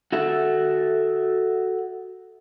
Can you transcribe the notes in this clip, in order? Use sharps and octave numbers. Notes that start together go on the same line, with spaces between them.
F#4 A4 E5